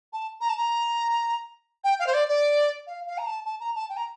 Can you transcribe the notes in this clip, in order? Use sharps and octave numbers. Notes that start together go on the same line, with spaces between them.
A5
A#5
A5
A#5
G5
F5
C5
D5
D5
F5
F5
A#5
A5
A5
A#5
A5
G5
A#5